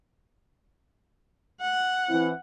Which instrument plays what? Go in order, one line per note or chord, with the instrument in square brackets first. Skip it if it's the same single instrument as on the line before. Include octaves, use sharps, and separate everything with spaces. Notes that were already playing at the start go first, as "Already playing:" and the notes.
[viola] F#5
[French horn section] E3 C4 E4